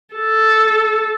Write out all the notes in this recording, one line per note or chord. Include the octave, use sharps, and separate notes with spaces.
A4